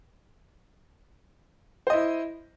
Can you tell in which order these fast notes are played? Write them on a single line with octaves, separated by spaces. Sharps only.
C5 D#5 E4